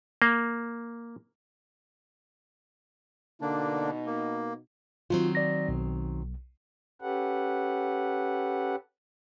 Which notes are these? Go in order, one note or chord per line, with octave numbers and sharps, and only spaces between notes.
A#3
B2 D3 A#3 D4 D#4
A#3
D#3 F#3 C4 F4
D5 A#6
B1
C#4 G4 A4 B4 F#5